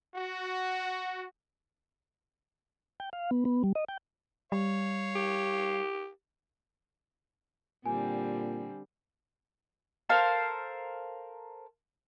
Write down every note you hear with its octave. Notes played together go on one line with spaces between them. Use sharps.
F#4
G5
F5
B3
B3
G3
D#5
G5
G3 C#5 F5
G4
A#2 D3 G3 C4 G#5
A4 A#4 C5 F5